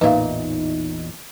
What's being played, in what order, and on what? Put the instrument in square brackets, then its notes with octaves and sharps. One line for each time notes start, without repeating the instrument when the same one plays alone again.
[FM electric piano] A1 D#4 [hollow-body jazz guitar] E2 A#2 [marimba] B4 E5 F5